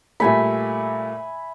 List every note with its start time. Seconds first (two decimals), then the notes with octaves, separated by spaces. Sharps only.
0.20 A#2 G3 A3 E5 G#5 B5